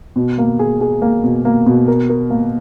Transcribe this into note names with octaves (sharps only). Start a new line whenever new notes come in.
B2
A#3
G#4
G#4
A#3
B2
A#3
B2
A#4
A#4
A#3